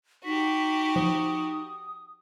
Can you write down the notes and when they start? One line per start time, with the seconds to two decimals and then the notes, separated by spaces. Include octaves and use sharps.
0.25 D#4 F#4 G4 B6
0.96 F3 D#6